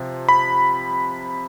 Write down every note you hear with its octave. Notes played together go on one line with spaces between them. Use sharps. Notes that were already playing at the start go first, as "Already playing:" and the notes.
Already playing: C3 F3
B5